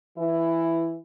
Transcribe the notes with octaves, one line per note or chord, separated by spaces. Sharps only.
E3 E4